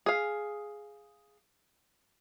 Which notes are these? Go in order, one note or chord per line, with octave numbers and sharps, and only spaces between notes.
G#4 F5